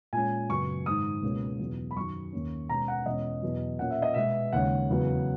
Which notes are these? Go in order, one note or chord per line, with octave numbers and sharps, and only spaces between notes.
A#2 G#3 C#4 G#5
F#2 C#3 F#3 B3 C#6
G#2 D#3 G#3 D#6
C#2 B2 A#3 C#4
E2 B2 F#3
B5
F#2 D#3 F#3 C#6
D#2 D#3 A#3 C#4
B2 G#3 C#4 A#5
F#5
E2 B2 G#3 C#4 D#5
E2 B2 F#3
A#2 A#3 C#4 F#5
E5
D#5
B2 G#3 B3 E5
D#2 C#3 G#3 C#4 F#5
E2 C#3 F#3 B3